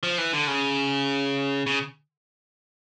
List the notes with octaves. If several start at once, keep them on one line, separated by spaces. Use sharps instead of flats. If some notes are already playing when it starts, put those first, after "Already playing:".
F3
E3
D3
C#3
C#3